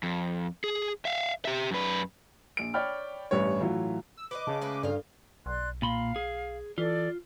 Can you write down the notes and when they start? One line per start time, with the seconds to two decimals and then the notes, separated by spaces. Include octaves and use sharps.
0.03 F2
0.64 G#4
1.05 E5 F5
1.45 G4 E5
1.71 F#2 B4
2.57 A#1 D7
2.74 C#5 D5 G5 B5 F6
3.31 A1 G2 B4 C#5
3.60 A2 E3 F#3 F4
4.17 E6
4.31 B4 C#5 D#5 D6
4.47 C#3 A5
4.61 G#3 A3 B4
4.83 G2 F4 A4 D5 F5
5.46 B1 D5 C6 F#6
5.82 A#2 F5 B5 C6
6.16 G#4
6.78 E3 F4 A4 D5